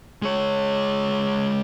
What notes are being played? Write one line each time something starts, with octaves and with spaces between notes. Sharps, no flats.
G#3 C#5